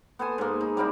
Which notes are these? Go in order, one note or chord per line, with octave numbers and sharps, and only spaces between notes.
B3 A4 C5 G#5
G#2 A#3
D#4
G3 A#3 C4 E4